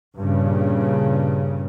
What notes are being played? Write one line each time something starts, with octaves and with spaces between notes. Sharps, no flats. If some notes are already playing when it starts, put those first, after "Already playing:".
G2 A#2 C#3